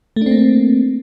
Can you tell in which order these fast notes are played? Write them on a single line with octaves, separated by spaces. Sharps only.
A3 D4 C4 A#3